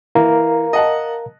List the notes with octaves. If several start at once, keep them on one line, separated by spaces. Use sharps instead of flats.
E3 A#4 F5 A#5
D#5 F#5 A5